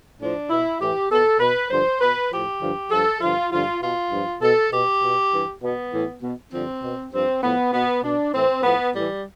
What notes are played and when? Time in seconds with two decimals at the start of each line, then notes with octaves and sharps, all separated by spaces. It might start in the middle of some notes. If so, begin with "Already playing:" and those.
0.20 A2 F3 D4
0.50 B2 E4
0.80 A2 E3 G4
1.11 B2 A4
1.40 B2 B4
1.71 G2 D3 F3 C5
2.01 B2 B4
2.31 A2 F3 G4
2.62 G2 D3 F3
2.91 G2 F3 A4
3.21 G2 D3 F3 F4
3.51 G2 D3 F3 F4
3.82 B2 F4
4.12 G2 F3
4.41 B2 A4
4.71 B2 G4
5.02 B2
5.32 G2 E3
5.62 B2 B3
5.93 A2 E3
6.22 B2
6.53 G2 D3 F3 C4
6.82 B2
7.13 G2 F3 C4
7.42 A2 F3 B3
7.73 B2 B3
8.03 B2 D4
8.33 A2 E3 C4
8.63 A2 F3 B3
8.94 A2 E3 G3